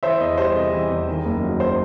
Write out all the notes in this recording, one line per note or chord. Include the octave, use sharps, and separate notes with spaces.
E3 C5 E5
E2 D#5
G3 C5
C3 D#5
E3
E2
D#3
F#1
F#3
C5